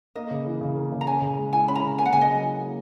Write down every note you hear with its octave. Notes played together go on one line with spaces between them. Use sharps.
A#3 D#5
C#3
E3
C#3
A#3
C#3
A#5
C#4 G#5
C#3
G#3
E4 G#5
C#4 B5
A#5
C#3
A#3 G#5
F#5
C#3 G#5
D#5
F#3
E4
A#3